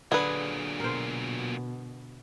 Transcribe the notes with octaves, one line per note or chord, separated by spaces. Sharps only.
A#2 D3 F#3 G#4 B4
B2 A#4 C5